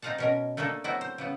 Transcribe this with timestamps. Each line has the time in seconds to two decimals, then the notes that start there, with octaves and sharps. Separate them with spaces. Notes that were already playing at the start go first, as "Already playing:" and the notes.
0.02 C4 D#4 F4 F5 F#5 A5
0.18 B2 C#4 A#4
0.57 A3 A#3 D4 G#4 A4
0.84 F#3 B3 C4 E4 F#4
1.01 C5
1.18 C#3 E3 B3